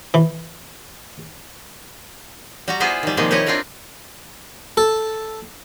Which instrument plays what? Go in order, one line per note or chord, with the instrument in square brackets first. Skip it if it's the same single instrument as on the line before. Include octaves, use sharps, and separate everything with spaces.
[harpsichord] E3
[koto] G3 F#4 A#5
B3 E4 F4 G#4 B4 C5
D#3 G3
C3 D#3 F3 G#3 A#3 G#4
E4 G4 B4 C#5 D#5
C4 D4 F4 A#4 B4
[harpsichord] A4